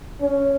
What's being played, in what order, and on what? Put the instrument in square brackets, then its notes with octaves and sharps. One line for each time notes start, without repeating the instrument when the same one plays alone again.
[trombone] C#4